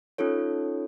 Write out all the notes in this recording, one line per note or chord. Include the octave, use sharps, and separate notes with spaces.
C#4 D#4 F4 A4 C#5